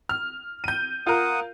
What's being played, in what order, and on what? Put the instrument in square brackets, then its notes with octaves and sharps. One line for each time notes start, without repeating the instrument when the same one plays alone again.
[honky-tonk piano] F6
G6 D#7
[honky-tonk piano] F4 A#4 [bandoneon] F#5 D#6